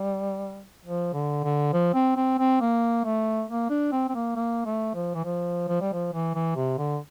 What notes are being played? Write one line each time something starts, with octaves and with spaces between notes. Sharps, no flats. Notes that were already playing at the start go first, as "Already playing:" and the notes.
Already playing: G3
F3
D3
D3
F3
C4
C4
C4
A#3
A3
A#3
D4
C4
C4
A#3
A#3
A3
F3
E3
F3
F3
G3
F3
E3
E3
C3
D3